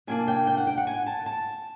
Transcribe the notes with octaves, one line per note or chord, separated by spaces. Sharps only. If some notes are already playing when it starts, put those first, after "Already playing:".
C3 F3 A#3 D4 G#5
G5
G5
F#5
G5
F#5
G#5
A5
A5